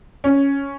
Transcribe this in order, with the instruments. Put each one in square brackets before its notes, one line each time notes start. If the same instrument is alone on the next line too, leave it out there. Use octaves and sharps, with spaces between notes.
[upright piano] C#4